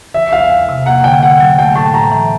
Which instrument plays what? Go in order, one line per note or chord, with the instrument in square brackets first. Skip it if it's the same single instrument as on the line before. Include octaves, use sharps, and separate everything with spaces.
[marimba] F3 [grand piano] E5
[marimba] E2 [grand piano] F5
[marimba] E2
C3
[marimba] A#3 [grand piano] F#5
[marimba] D3 [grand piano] G5
[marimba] D3 [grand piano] F#5
[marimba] F#3
[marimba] A3 [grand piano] G5
[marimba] A2 [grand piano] A5
[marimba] A2 [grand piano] A#5
[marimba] E3